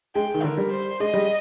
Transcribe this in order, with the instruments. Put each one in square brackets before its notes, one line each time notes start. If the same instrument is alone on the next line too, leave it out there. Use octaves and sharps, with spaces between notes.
[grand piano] G#3 [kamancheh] G5
[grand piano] D#3
[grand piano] D3 [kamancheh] A#4
[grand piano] G3
[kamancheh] C5
[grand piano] G#3 [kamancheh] D#5
[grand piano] G3